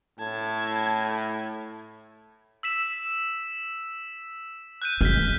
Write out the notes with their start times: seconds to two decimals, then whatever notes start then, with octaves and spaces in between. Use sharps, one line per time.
0.19 A2 A5 G#6
2.63 E6 B6 E7
4.82 F#6 G6 D#7
5.01 G#3 F6 G6 B6